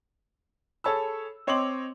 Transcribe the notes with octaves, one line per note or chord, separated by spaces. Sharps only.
G#4 A4 C#5 A5 B5 E6
C4 C#5 D#5 C6 D6 F#7